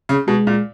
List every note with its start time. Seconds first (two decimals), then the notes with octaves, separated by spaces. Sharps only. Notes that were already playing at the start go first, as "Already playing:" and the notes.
0.09 C#3
0.28 B2 G#3
0.47 A#2